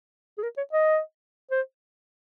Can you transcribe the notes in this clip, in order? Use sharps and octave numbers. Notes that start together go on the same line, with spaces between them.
G#4
A#4
C#5
D#5
C5